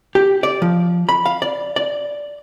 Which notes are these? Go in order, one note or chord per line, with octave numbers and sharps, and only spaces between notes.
G4
D5
F3
B5
F5
D5
D5